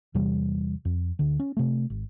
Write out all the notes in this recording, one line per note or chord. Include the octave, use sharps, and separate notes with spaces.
E2 C3 E3 G3
F2
D2 D3
C#4
C3 A3
G#1